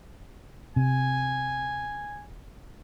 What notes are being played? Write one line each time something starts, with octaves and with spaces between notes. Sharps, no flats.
C3 G#5